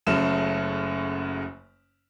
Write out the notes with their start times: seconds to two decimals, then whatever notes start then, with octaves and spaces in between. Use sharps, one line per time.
0.07 F#1 F#2 C#3 A3 C#4 E7